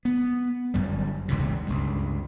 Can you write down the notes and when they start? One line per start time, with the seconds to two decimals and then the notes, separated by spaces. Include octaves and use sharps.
0.05 B3
0.74 G1 F#2 G3
1.28 E1 C#2 G#2 C3
1.66 C#2 G2